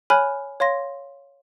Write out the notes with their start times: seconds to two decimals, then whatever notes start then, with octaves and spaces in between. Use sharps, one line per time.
0.10 C#5 G#5 B5 F6 F#6
0.60 C#5 F5 C6 A#6